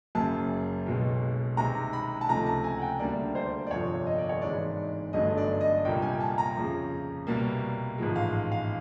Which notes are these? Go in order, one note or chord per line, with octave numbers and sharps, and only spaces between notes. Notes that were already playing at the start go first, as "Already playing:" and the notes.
F#1 F#2 C#3 A5
B1 B2 G#3
C2 C3 D#3 G#3 A#5
B5
A5
C#2 C3 F3 A3 A#5
A5
G#5
F#5
G5
D2 D3 G3 A#3 D5
C5
D5
G1 F2 C3 F3 C#5
D#5
D5
C#5
G#1 G#2 E3 G#3 D5
G1 G2 D3 F#3 A3 D#5
D5
D#5
C2 A#2 G3 A#3 G5
G#5
A5
A#5
F2 C#3 F3
C2 B2 G3 A#3
A1 G#2 F3 G#3
F5
F5